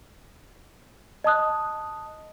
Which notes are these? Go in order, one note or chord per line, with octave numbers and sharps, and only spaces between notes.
D#5 A5 D#6 F#6